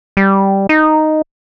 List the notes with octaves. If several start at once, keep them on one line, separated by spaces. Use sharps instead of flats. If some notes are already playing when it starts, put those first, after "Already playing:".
G3
D#4